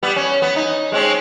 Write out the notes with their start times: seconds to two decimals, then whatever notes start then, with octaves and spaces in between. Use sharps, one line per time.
0.03 G3 B3
0.16 C#4
0.42 B3
0.56 D#4
0.92 G#3 C4 C#4